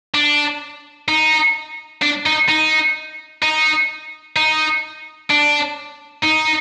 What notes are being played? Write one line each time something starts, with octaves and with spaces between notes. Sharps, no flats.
D4
D#4
D4
D#4
D#4
D#4
D#4
D4
D#4